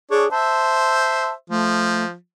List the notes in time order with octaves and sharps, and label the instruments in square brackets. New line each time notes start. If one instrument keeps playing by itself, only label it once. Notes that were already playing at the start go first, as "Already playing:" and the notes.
[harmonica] D4 C#5 [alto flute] G#4
[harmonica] C5 E5 [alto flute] A5
[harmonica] F3 [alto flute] A3